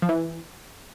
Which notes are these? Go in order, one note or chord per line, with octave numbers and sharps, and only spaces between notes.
F3
E3